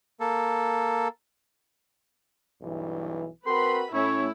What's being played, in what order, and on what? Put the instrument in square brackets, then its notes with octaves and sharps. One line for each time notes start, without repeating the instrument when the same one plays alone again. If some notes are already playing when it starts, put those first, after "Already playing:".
[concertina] A#3 A4
[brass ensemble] B1 G2 E3
[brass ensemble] C4 F#4 A#4 [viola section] B4 B5 [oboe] C6
[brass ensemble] A2 C#4 [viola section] A3 E4 E5 [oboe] C#5